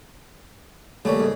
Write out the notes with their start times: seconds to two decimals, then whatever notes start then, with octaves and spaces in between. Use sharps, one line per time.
1.05 D#2 C#3 G3 A3 C#4
1.20 G#2 C#3